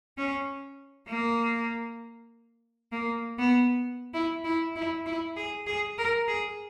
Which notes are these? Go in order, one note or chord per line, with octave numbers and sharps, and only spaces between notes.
C#4
A#3
A#3
B3
E4
E4
E4
E4
G#4
G#4
A#4
G#4